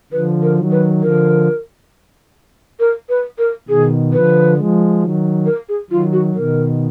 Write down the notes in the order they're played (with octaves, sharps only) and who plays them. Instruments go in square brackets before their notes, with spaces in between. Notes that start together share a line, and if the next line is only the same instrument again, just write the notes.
[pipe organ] D3 F3 [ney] B4
[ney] A#4
[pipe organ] D#3 F#3
[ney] B4
[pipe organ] D3 F3 [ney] A#4
[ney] A#4
B4
A#4
[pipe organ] B2 D#3 [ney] G#4
[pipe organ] D3 F3 [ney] B4
[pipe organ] F3 G#3
D#3 F#3
[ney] A#4
G#4
[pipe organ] D#3 F#3 [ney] F4
[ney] F#4
[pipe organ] B2 D#3 [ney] A#4